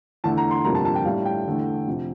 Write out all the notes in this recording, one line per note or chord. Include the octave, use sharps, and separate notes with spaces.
E2 D3 A3 A5
A#5
C6
G1 F2 C3 G3 A#3 A#5
A5
A5
G5
A1 A2 G3 F5
G5
E2 D3 A3
F2 C3